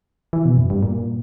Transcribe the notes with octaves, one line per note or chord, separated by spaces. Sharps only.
E3
B2
F#2
G2
A#2